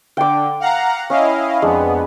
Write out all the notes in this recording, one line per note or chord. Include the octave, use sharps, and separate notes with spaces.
D3 G5 D6
F5 F#5 A#5
C#4 E4 D#5 F5
F2 G#3 B3 D4